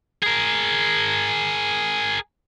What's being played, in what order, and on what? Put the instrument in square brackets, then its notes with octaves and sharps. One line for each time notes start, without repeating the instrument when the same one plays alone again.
[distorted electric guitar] G#4 A#4